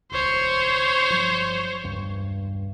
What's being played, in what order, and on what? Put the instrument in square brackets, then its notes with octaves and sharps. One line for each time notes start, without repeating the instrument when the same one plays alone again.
[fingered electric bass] D#1 C#2 [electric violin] C5 C#5
[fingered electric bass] G1 F3 F#3
E1 C#2 G2